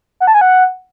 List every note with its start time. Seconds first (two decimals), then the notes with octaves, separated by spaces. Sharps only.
0.20 F#5
0.27 A5
0.34 G#5
0.41 F#5